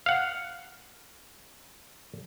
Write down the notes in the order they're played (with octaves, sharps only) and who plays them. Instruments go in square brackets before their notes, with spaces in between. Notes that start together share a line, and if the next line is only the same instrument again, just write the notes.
[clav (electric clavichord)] F5 F#5